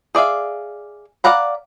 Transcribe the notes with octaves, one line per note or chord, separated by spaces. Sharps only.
G#4 D5 E5 F5
D5 F5 F#5 A#5 B5